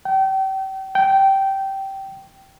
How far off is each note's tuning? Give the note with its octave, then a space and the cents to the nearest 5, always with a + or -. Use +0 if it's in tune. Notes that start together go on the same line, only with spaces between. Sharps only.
G5 -35
G5 -15